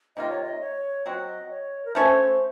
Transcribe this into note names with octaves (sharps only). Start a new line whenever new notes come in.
C3 D#3 A#3 F4 D#5
C#5
D#5
C#5
F#3 C4 F#4 D#5
C#5
A#4
A3 C#4 A4 C5 C#5